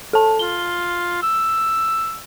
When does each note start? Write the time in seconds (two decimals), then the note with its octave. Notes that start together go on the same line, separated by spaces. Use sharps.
0.13 A4 A5
0.39 F4 G7
1.22 E6